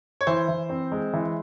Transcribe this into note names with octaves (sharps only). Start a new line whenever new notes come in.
C#5
E3 C5
E3
C4
G#3
E3